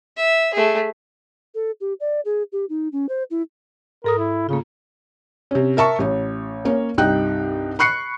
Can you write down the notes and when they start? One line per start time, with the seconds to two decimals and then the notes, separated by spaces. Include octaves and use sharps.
0.17 E5
0.54 A3 G#4
1.55 A4
1.81 G4
2.00 D5
2.25 G#4
2.52 G4
2.69 D#4
2.92 C#4
3.09 C5
3.31 E4
4.04 G#2 A4 A#4 D#6
4.19 E4
4.49 C#3 A#3 F4
5.51 C3 C#4
5.77 A#4 E5 A5 C#6
5.99 A1 C#5
6.65 A#3 C#4 C#5
6.98 C2 G2 D#4 G5 F#6
7.79 B5 C#6 F#6 C7 C#7